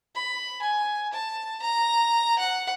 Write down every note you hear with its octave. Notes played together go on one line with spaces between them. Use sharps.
B5
G#5
A5
A#5
F#5